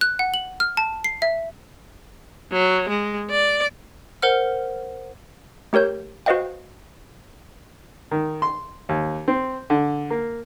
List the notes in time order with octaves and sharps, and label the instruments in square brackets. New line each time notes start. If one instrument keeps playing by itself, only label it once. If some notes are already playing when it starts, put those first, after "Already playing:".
[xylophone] F#6
F#5
F#7
F6
A5
C7
E5
[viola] F#3
G#3
D5
[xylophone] A#4 C5 F#5 F6
[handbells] A3 G4 A#4 C#5 G6
F#4 B4 C5 D#5 F5 G5
[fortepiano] D#3
C6
D#2
C4
D3
A#3